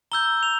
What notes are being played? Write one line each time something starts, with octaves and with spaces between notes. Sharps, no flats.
A#5 E6 G6 G7
F7